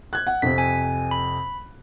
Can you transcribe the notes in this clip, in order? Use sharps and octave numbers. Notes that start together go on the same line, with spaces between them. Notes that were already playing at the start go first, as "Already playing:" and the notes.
F#6 G#6
F#5
F2 C3 C4 B6
G#5
B5